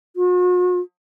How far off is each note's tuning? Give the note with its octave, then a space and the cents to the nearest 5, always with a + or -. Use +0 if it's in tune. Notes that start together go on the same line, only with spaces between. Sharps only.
F#4 -45